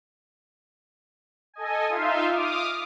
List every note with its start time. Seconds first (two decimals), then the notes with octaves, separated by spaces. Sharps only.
1.54 A4 D#5 G#5
1.89 D#4 F4 E5 F5 C6
2.30 D6 D#6 F6